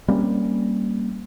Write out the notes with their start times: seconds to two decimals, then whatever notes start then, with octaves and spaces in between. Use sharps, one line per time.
0.08 G3 A#3 C4 C#4